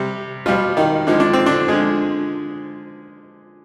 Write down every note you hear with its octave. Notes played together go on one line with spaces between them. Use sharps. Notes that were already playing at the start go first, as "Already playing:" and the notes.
Already playing: C3 G3 G4
B2 F3 G3 F4
D#3 D#4
D3 F3 G#3 D#4
D4
C4
D3 D4
D3 F3 G#3 G#4